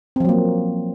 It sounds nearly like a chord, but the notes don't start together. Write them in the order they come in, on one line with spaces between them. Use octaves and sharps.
C4 F3 F#3 A#3